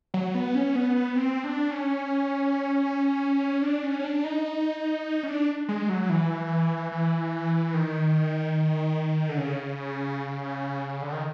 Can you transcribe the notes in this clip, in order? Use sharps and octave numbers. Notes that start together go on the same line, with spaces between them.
F#3
B3
C#4
B3
B3
C4
D4
C#4
D4
C#4
C#4
D4
D#4
C#4
D4
G#3
F#3
E3
E3
D#3
D3
C#3
D3
D#3